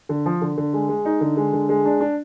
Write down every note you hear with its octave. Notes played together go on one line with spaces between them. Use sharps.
D3
F3
D3
D3
G#3
G#3
D#4
D3
G#3
D3
G#3
D4
D4